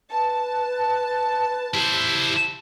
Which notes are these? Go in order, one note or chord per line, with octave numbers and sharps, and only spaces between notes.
B4 A5
E4 G4 C5